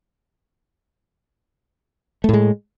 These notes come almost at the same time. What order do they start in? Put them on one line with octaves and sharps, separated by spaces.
A3 A2 G#3